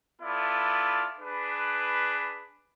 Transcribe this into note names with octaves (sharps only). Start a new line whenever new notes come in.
B3 E4 F4 A4 D5
D4 G#4 B4